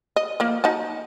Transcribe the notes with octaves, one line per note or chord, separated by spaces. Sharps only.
D#5
F3 A#3
D#4 F#4 A5